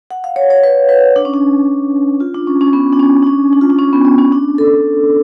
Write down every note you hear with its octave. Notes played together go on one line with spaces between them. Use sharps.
F#5
F5
C#5
C#5
B4
B4
D4
C#4
D4
F4
D4
C#4
C#4
B3
D4
C#4
D4
C#4
D4
F4
D4
C#4
B3
B3
C#4
D4
A4